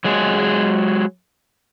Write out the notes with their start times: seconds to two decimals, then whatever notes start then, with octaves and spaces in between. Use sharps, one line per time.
0.05 F#3 G#3 G#4